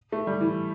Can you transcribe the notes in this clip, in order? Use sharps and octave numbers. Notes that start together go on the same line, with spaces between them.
A3
G3
E3